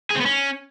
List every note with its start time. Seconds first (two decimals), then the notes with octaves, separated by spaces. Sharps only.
0.10 G#4
0.15 C4
0.21 B3
0.26 C#4